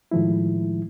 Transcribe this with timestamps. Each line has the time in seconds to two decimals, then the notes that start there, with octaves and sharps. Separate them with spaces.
0.11 A2 D#3 F3 G#3 E4